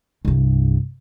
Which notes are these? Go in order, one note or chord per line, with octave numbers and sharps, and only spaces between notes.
C2 G2